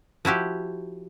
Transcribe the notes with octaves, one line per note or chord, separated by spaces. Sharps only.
F3 E4 F#4 G4